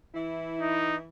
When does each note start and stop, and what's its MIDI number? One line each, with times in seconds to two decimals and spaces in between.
0.14 1.08 52
0.14 1.08 64
0.60 0.96 63